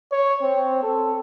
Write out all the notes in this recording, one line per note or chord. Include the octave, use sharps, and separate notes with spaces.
C#5
C4
A4